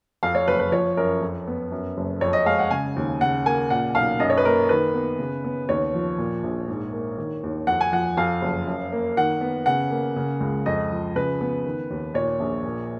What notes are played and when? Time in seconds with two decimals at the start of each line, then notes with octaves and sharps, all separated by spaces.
0.23 F2 F5
0.35 C#5
0.47 F#1 B4
0.59 B4
0.72 F3 C#5
0.97 F#2 A#4
1.21 F2
1.47 B3
1.72 F#2
1.97 F#1
2.21 F2 C#5
2.33 D#5
2.46 G#3 F5
2.59 F#5
2.71 C#3 G#5
2.96 D#2
3.21 C#3 F#5
3.46 A#3 G#5
3.70 A#2 F#5
3.95 B1 F5
4.20 F#2 D#5
4.30 C#5
4.38 B4
4.45 A#3 A#4
4.69 D#3 B4
4.94 B3
5.19 C#3
5.44 B3
5.69 D#2 C#5
5.94 F3
6.18 A#2
6.43 A#1
6.68 G#2
6.93 A#3
7.18 D#3
7.43 D#2
7.67 F2 F#5
7.81 G#5
7.92 F3 F#5
8.17 F2 F5
8.42 F#1
8.67 F#2
8.92 A#3
9.17 D#3 F#5
9.41 B3
9.66 C#3 F#5
9.91 A#3
10.16 C#3
10.40 C#2
10.66 F2 D#5
10.91 F3
11.15 C#3 B4
11.41 B3
11.65 D#3
11.90 D#2
12.14 A#2 C#5
12.40 A#1
12.64 A#2